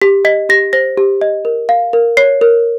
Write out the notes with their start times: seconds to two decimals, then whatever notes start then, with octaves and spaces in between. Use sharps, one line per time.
0.02 G4 B6
0.25 D#5 B6
0.49 G4 A#6
0.73 C5 A#6
0.98 G4
1.21 D#5
1.45 A#4
1.69 F5
1.93 A#4
2.17 C#5 C7
2.41 A#4